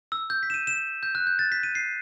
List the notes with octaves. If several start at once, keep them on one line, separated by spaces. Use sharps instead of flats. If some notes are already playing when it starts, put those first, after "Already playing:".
E6
G6
B6
E7
D#7
E7
G6
F#6
G6
A6
B6
D#7
C7